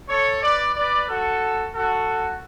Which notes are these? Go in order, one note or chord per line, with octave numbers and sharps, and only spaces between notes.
A4 C#5
B4 D5
B4 D5
F#4 A4
F#4 A4